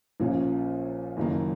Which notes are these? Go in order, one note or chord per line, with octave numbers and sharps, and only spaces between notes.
A#1 A#2 F3 A#3 C#4
F#1 F#2 D#3 A#3